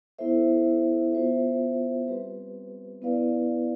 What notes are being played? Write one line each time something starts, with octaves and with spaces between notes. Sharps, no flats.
B3 E4 A4 C5 E5
B3 F4 C5 E5
G3 C4 G4 B4
B3 E4 B4 D5 F5